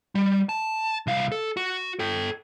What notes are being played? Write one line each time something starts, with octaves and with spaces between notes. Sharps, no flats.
G3
A5
C2 F5
A4
F#4
A4 G5